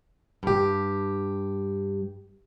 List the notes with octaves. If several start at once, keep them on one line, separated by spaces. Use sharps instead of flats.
G2 G4